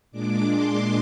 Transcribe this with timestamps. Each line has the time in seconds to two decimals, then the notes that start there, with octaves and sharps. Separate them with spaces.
0.11 A#2 G#3 D4 D6
0.48 C6